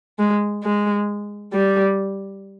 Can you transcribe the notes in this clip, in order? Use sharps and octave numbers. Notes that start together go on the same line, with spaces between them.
G#3
G#3
G3